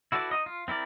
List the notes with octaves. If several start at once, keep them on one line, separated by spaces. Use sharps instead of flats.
E4 F#4 A4 B4 D5
D#4 D#5
F4
C4 E4 A#4 D5